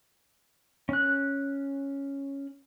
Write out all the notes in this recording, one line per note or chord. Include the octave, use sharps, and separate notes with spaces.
C#4 F#6